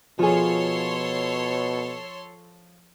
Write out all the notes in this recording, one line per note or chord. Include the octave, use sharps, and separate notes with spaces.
B2 F3 F4 G#4 A4 C#5 C6